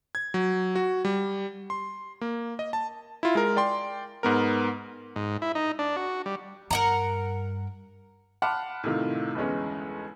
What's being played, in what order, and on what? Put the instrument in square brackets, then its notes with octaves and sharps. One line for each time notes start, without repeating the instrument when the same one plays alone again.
[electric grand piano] G#6
F#3
F#4
G3
C6
A#3
D#5
A5
E4 F4
G#3 A#4
D5 G5 C6
G#2 B3 A#4
[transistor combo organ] G#2
E4
D#4
D4
F#4
G3
[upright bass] G2 [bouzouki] A#4 F#5 A#5
[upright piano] F#5 A5 B5 C6 D6 F6
A2 C3 D#3 F4
G1 E2 G#3 C#4